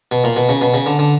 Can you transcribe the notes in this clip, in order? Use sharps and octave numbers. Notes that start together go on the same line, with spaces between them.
B2
A#2
B2
C#3
B2
C#3
D3
D3